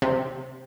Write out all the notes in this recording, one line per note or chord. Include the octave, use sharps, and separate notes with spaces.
C3